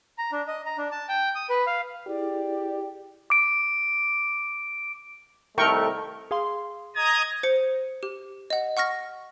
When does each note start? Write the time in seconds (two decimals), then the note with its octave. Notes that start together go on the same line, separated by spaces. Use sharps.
0.18 A#5
0.32 D4
0.48 D#5
0.66 A#5
0.78 D4
0.92 A5
1.09 G5
1.35 D#6
1.49 B4
1.67 F5
2.07 E4 G4 G#4 D5
3.30 D6 D7
5.58 C2 D#3 A3 A#4 G5 C#6
6.31 G#4 F5 C6
6.96 D#5 A#5 D#6 G#6
7.43 C5 C#7
8.03 G4
8.50 D#5 F#5
8.77 F#5 C#6 F6 A#6